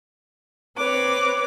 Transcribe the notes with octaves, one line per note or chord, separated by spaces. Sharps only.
C4 B4 C#5 D6